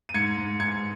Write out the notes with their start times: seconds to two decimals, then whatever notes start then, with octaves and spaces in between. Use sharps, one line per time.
0.09 D#7
0.14 G#2 G#6 C#7
0.37 G#2
0.59 G#2 G#6 C#7